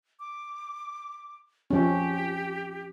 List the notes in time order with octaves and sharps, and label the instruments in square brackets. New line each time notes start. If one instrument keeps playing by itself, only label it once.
[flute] D6
[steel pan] F3 C#4 [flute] G4